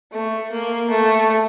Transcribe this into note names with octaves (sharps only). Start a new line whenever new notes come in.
A3
A#3
A3